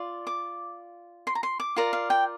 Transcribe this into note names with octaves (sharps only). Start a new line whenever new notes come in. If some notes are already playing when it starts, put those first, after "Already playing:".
Already playing: F4 D5
D6
C6
A#5
C6
D6
F4 A#4 D5 A#5
F5
G5